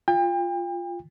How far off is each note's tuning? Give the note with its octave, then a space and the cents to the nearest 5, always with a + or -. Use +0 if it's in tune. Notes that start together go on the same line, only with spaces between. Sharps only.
F4 +0 G5 +35